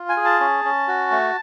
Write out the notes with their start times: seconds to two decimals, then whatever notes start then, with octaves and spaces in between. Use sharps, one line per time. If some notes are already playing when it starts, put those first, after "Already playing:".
Already playing: F4
0.09 G#5
0.17 G#4
0.25 A5
0.40 C#4
0.65 C#4
0.88 F#4
1.11 A3